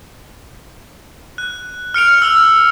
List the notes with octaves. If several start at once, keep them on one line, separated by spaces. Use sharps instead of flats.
F#6
F6 C#7 D7 F7
E6 F6 F7